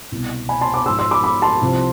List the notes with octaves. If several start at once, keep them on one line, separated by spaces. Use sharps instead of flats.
C2 B2
G#5 B5
A5 C6
B5 D6
G#2 F3 C6 E6
C6 E6
B5 D6
B5 D6
A5 C6
C2 C3 F3